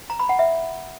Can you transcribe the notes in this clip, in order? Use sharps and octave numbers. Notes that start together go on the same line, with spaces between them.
A#5
B5
F#5
E5